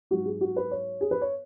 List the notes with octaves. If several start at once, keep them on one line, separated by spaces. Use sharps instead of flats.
G#2 F#3 F#4
G#4
F#4
B4
C#5
G#4
B4
C#5